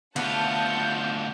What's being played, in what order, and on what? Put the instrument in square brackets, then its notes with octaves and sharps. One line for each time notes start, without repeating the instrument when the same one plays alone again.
[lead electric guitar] D2 F4 [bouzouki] B3 [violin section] F#5 A5 G6